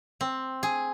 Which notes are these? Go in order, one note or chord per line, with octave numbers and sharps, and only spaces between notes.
C4
G#4